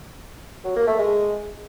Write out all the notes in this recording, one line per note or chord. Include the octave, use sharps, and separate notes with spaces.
F#3
A#3
A3
G#3